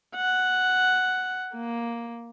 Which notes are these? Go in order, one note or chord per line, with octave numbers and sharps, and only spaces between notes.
F#5
A#3